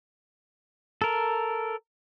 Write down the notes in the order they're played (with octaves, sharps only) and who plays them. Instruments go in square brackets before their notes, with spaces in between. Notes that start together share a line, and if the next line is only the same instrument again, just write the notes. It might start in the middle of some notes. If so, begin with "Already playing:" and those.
[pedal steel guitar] A4 A#4